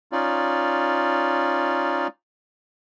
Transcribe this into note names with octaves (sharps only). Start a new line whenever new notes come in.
C#4 D#4 F4 D5